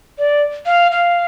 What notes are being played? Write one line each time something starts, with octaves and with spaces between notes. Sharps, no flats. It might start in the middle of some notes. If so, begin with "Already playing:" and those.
D5
F5
F5